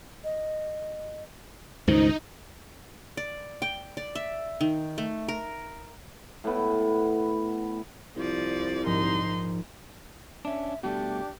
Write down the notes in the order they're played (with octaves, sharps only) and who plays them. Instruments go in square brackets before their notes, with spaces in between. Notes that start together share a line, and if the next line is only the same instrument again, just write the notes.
[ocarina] D#5
[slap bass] C#2 G2 D#3 [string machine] D#4 [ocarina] C5
[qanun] D5
G5
D5
E5
D#3
A3
A#4
[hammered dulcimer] A2 B3
[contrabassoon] C2 [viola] F3 D5
[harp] A#1 G#2 F3 [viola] D#4 C6
[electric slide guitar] C#4 D4 [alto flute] E5
[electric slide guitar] B2 G3 A3 [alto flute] D4 [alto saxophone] G4